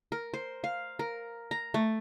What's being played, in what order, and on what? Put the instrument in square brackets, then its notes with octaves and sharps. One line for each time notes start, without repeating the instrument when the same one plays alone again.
[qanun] A#4
C5
F5
A#4
A#5
A3